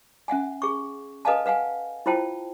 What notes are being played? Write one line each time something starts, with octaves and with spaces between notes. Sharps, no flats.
C#4 E5 F#5 G#5
G#4 C#6
A4 B4 D#5 F5 G#5 A5
B4 F5 F#5 G#5
E4 F4 C5 G5 A5